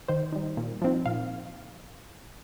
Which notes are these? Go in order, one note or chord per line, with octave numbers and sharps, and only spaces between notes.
D#3 C5
G3 D#4
A#2
F3 C4 D#4
A#2 F5